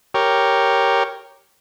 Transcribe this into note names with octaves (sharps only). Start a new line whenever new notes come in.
G4 A#4 C#5